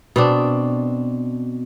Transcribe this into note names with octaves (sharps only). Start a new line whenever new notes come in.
B2 C4 D4